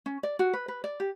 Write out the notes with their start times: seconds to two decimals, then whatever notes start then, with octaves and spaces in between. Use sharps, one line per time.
0.06 C#4
0.23 D5
0.39 F#4
0.53 B4
0.68 B4
0.84 D5
1.00 G4